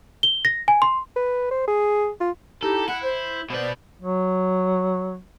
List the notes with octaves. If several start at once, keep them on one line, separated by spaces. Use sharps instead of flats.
G7
A#6
G#5
C6
B4
C5
G#4
F4
D#4 E4 G4 A4
E4 F#5
C5
B2 B4 C5 D5
F#3